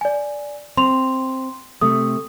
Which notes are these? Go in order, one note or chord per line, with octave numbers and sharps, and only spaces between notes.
D5 G#5
C4 C6 F7
C3 A3 D#6